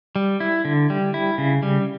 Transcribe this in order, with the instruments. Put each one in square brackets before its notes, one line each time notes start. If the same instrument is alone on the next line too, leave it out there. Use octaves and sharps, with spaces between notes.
[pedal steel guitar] G3
E4
D3
G3
E4
C#3
G3